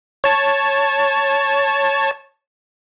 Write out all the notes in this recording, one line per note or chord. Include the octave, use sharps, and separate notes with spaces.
C#5 A5